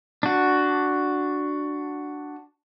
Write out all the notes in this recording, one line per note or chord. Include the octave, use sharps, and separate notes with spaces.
D4 F#4